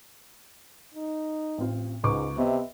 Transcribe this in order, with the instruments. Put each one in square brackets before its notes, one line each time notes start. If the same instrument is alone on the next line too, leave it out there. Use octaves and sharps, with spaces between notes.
[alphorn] D#4
[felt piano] A1 C4 F4
[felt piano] C#2 C#6 D6 [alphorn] G#2
[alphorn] C3 [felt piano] B3 D#5 E5